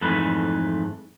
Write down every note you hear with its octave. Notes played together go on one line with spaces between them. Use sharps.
F2 G#2 E3 A3 B4